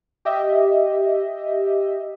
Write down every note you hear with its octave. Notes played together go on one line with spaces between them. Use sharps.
G4 D#5 E5